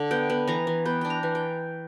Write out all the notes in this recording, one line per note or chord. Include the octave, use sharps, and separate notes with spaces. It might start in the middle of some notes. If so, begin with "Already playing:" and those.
Already playing: D3 D4
B3 G5
B3
E3 A#5
E3
B3 G5
D4 G5
A#5
E3
G5